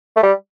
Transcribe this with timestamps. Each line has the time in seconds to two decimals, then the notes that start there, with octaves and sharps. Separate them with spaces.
0.16 A3
0.23 G3